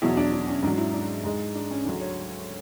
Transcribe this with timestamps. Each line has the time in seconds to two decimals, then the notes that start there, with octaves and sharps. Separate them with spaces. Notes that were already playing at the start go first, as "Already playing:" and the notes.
0.02 E2 B2 F#3 E4
0.17 D4
0.32 D4
0.47 C#4
0.63 G#2 D4
0.67 F#3
0.78 E4
0.94 D4
1.24 G#2 G#3
1.55 D4
1.71 C#4
1.85 D2 C#3 F#3 D4
2.01 C#5